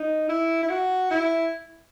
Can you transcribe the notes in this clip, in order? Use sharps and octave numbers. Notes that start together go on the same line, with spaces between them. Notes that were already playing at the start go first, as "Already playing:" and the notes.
Already playing: D#4
E4
E4
F#4
E4